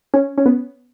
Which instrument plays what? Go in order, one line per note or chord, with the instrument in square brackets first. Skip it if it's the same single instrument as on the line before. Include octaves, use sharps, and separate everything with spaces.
[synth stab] C#4
C#4
B3